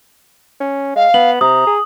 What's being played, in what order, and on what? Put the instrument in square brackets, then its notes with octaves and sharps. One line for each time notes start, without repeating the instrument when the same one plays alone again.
[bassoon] C#4
[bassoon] G#3 [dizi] F5
[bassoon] B3 [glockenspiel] F#7
[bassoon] C3 [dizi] A#5 [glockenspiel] D#6
[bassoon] G#4